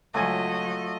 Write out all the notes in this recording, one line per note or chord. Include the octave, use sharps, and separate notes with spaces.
C#2 F#3 A3 F4 A4 D#5 G#5